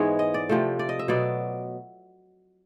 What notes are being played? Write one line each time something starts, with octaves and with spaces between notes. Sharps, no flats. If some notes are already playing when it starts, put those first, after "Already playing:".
Already playing: G#2 E3 G#3 B3 C#5
D#5
D5
C3 F3 A3
D5
D#5
E5
B2 F#3 B3 D5